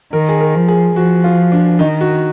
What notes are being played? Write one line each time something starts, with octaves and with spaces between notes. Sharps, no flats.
D#3 A#4
G#4
A#4
F3
G#4
F3 F#4
F4
D4
D#3 D#4
F#4